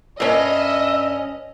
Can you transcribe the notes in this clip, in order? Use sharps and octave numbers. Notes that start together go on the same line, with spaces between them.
G2 C#4 D#5 E5